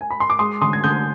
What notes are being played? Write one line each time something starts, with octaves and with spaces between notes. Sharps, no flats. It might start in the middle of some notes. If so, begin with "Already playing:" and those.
G#5
B5
C6
D6
G#3 C6 D#6
D3 C6 D#6
G#6
D3 D#6 G6